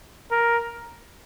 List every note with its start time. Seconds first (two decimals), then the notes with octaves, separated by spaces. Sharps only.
0.31 A#4